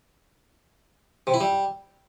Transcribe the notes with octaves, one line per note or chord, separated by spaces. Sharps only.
C3
E4
G3